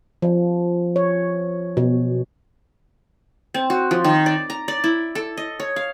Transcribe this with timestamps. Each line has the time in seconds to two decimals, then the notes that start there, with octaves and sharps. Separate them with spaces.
0.22 F3
0.96 C#5
1.77 B2
3.54 C4
3.70 F#4
3.91 F3
4.04 D#3
4.26 D5
4.50 A#5
4.68 D5
4.84 E4
5.15 A4
5.37 D#5
5.60 C#5
5.76 F5